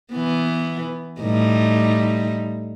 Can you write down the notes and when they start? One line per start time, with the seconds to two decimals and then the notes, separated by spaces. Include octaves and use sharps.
0.13 E3 B3
1.21 A2 G3 D#4